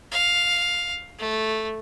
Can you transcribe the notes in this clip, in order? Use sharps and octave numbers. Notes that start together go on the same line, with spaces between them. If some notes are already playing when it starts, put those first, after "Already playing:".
F5
A3